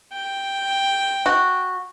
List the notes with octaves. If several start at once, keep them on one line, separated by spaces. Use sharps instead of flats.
G5
F#4